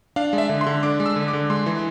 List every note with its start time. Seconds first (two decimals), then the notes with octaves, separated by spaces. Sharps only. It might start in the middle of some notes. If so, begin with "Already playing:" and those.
0.16 D4 F5
0.33 G#3
0.38 E5
0.49 D3
0.61 C6
0.66 D3
0.83 D4 D6
1.00 G#3
1.06 E6
1.16 D3
1.28 D6
1.33 D3
1.50 G#3 C6
1.66 E3